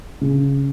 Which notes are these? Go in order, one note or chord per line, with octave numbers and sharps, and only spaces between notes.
C#3